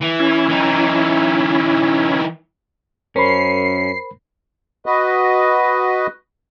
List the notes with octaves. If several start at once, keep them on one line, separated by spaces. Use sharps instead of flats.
E3
C#4 E4
E3 D#4
F#2 C#4 A#4 C5 B5 C7
F#4 B4 D#5